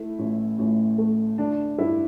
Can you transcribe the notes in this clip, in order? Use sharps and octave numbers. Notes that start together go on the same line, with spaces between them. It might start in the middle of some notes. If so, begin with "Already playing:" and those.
Already playing: A3 E4
A1
A1
A3
D3 D4
G2 E4